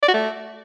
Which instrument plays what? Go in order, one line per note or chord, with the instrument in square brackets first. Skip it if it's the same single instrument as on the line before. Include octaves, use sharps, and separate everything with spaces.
[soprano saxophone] D5
F#4
A3